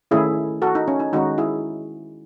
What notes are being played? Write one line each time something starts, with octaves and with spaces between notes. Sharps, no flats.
D#3 A3 C#4 E4 G#4
F#4 A4
D#4
C#4
D#4
D#3 G#3 C#4 D#4 F#4
E4 G#4